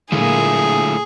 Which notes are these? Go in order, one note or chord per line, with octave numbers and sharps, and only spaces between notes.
A#2 D3 F#3 G#3 A3 E4 F4 G#4